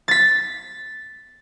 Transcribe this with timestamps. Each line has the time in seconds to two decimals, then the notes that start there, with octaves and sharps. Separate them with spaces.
0.08 A6 B6